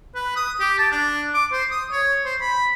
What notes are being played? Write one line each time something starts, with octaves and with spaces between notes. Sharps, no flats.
B4
D#6
G4
A5
D4
D6
C5
D#6
C#5
C5
B5